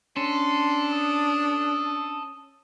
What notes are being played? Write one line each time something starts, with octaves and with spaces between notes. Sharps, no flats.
C#4 D4 A4 C6
D#6